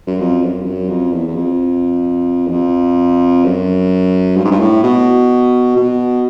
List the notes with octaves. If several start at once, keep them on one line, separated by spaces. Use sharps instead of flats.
F#2
F2
F#2
F2
F#2
F2
E2
E2
F2
E2
F2
F#2
G2
G#2
G2
A2
B2
B2